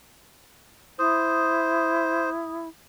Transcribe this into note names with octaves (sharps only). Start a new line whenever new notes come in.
E4 C5 D#6